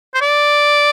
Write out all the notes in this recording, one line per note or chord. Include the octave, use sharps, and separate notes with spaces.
C5
D5